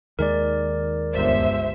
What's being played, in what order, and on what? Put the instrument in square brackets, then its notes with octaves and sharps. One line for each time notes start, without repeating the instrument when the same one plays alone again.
[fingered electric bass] D#2 D#3 G#3 [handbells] A#4 D5
[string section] G1 C#2 [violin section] C5 E5